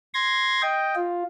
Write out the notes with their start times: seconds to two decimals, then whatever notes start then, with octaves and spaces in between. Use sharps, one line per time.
0.14 C6 G#6 A#6
0.62 D#5 G5
0.95 F4